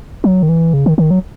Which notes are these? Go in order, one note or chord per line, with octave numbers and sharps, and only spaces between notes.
F#3
D#3
E3
C#3
D#3
D#3
F#3